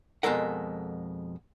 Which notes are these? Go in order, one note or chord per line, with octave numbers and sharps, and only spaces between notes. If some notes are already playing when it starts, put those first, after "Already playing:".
F2 B2 G#3 A4 A#4 F#5